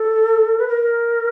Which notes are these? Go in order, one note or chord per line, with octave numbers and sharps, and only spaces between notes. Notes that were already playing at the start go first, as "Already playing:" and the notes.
Already playing: A4
B4
A#4